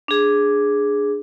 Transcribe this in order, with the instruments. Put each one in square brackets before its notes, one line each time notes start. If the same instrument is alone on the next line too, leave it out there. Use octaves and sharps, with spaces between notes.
[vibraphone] D4 G#4